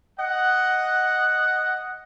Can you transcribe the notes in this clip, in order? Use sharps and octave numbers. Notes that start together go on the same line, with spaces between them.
D#5 F#5